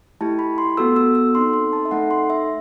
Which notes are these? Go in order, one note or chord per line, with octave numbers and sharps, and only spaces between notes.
A3 E4 G4 A5
B5
C6
B3 F#4 A4 E6
E6
E6
C4 D#4 A4 C6
C6
A5
E5
A3 D#4 A4 F#5
C6
E5